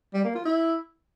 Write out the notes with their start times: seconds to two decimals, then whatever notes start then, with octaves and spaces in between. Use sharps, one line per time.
0.14 G3
0.24 A#3
0.35 F4
0.45 E4